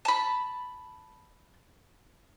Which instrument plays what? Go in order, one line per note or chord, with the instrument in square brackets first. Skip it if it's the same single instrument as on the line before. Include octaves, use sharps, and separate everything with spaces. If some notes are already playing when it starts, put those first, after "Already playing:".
[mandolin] A5 B5